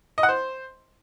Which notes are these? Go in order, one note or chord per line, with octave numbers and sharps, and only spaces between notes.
D#5
F#5
C5